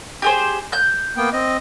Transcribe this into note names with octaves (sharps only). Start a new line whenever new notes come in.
G4 G#4 C5
F#6 G6
A#3 B3 G5
C4 D#5